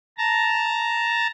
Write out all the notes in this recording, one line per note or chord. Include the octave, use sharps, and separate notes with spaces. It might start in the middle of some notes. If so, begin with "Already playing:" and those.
A5 A#5